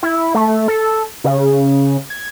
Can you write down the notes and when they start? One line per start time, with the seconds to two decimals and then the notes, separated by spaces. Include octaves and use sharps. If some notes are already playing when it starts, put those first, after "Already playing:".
0.03 E4
0.35 A3
0.68 A4
1.24 C#3
2.10 G#6